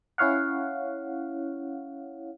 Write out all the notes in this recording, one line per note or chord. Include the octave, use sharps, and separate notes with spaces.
C#4 E4 C#5 F5 F#5